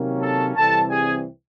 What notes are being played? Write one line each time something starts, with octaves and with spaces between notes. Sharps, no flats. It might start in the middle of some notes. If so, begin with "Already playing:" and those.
Already playing: C3 D#3 F#3 A#3 C#4
A4 A5
C2 C3 E3 G3 C4 A4 A5
G#4 G#5